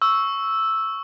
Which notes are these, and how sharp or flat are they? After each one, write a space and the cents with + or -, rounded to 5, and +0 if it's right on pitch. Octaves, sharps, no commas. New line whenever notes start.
C#6 +0 E6 +0